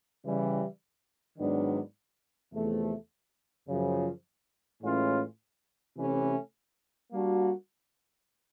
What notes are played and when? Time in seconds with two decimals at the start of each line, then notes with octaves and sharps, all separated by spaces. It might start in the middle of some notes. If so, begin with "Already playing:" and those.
0.25 C#3 E3 G3
1.38 G#2 D#3 F#3 B3 D4
2.53 E2 C3 F3 A3
3.67 F#2 C#3 F3
4.81 A2 E3 G#3 C#4 F4
5.96 C3 E3 A3 C#4
7.11 G3 A#3 D4 F#4